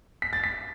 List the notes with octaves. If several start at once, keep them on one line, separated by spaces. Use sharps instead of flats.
B6
A6
B6